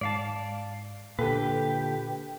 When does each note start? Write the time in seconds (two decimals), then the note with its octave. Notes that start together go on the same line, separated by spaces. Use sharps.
0.01 G#2 D5 F5 A5
1.19 A#2 D3 G4 A4 B4 G5 B6